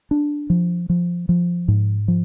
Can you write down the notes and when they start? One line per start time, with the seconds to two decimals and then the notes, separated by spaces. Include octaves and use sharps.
0.11 D4
0.50 F3
0.90 F3
1.29 F3
1.68 G#2
2.08 F3